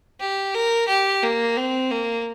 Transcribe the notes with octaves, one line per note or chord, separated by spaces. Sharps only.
G4
A#4
G4
A#3
C4
A#3